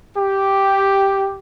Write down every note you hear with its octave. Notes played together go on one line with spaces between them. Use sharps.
G4